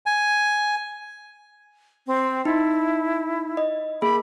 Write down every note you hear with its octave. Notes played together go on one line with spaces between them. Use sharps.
G#5
C4
D#4 E4
D#5
A#3 G#4 B5